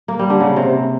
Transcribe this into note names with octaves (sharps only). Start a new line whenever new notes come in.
A#3
G3
D3
C#3
C3